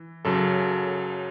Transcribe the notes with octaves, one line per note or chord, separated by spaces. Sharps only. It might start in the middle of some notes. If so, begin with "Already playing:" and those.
Already playing: E3
F#2 C#3 F#3 A4